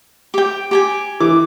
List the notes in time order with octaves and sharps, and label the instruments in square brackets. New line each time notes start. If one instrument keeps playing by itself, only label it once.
[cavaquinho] G4 G5
G4 G5 G#5
[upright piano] E3 [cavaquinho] D6